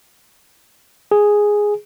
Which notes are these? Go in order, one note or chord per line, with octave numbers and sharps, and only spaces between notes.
G#4